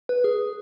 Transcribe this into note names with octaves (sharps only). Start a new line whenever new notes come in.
B4
G#4